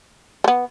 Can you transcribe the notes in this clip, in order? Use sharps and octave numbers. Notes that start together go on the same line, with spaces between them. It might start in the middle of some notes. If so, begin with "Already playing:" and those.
A3
B3